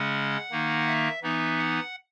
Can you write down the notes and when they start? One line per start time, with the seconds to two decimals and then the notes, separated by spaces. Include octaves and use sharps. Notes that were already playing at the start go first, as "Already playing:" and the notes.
Already playing: C#3 G#3 C#4 F#5
0.51 D#3 A#3 D#4
0.87 E5
1.22 E3 B3 D#4 E5
1.58 F#5